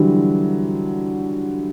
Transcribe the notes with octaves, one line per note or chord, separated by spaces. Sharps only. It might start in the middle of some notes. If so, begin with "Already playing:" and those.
Already playing: D3 E3 F#3 G3